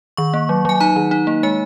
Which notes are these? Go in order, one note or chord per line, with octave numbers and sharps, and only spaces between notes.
D#3 C#6
A#3
F#3
F#3 G#5
D#4 A#5
D#3
D#4
A#3
G#3 G#5